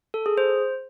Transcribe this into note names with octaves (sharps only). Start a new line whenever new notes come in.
A4
G#4
C5